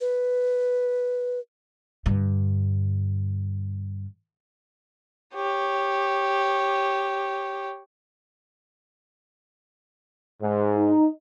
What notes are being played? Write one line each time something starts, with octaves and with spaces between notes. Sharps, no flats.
B4
G2 D3
G4 C#5
G#2
D#4